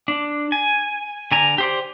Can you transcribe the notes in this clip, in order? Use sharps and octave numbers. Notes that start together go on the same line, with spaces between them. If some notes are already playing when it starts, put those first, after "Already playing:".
D4
G#5
D3 G#5 A#5
G4 C5 D5